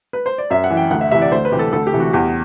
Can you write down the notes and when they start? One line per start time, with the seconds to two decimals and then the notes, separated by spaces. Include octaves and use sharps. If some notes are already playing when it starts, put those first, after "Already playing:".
0.13 B4
0.26 C5
0.38 D5
0.50 F#2 E5
0.64 F#5
0.70 E3
0.77 G5
0.91 D2 F#5
1.01 E5
1.11 C3 E3 E5
1.22 D5
1.32 D2 C5
1.45 B4
1.52 C3 E3 G4
1.59 A4
1.73 D2 A4
1.87 G4
1.93 C3 E3
2.00 F#4
2.13 E2 G4